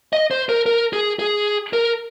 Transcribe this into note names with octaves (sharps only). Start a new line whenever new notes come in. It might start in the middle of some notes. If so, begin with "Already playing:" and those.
D#5
C5
A#4
A#4
G#4
G#4
A#4